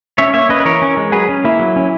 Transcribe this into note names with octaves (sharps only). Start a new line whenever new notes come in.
C#4 C#5 E5
A#3 C#5 E5
C#4 B4 D#5
B4
E3 A#4 C#5
C#4
G#3
F#3 G#4 B4
C#4
A#3 E4
F#3
C#4